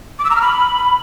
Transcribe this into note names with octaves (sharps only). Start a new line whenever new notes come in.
D6
E6
A#5
F6
B5